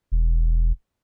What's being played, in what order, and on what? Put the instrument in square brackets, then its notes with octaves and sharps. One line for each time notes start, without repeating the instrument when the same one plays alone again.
[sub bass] E1